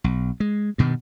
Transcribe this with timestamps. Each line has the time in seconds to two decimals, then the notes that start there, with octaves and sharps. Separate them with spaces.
0.04 B1
0.40 G#3
0.78 G2 B2 D#3